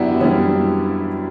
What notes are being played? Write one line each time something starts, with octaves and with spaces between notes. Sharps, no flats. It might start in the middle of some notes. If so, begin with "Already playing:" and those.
Already playing: F#2 E3 B3 D4 E4 F#4 G4
F#2 E3 G3 C#4